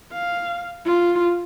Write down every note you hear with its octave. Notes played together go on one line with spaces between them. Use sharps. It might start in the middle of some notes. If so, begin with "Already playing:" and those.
F5
F4